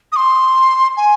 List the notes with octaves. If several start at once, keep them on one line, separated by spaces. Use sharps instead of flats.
D#6
C6
G#5